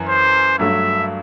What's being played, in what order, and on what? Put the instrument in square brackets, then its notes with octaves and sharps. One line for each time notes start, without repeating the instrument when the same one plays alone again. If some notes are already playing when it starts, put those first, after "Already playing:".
Already playing: [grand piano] F#2 E3
[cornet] C5
[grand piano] G2 F#3 A3 [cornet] E5